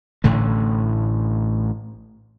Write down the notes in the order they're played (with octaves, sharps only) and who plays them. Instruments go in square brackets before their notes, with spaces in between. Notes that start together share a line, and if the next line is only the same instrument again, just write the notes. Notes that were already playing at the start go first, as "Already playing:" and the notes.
[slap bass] A1 A2 D3 A3